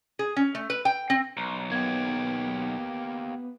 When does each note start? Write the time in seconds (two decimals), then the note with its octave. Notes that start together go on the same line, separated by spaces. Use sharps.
0.19 G#4
0.36 C#4
0.55 A3
0.70 B4
0.85 G5
1.10 C4
1.37 B1 A#5
1.72 A#3 B3 G4 G#6